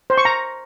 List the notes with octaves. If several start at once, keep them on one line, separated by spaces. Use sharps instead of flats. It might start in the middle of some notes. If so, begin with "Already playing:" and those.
C5
C#6
A#5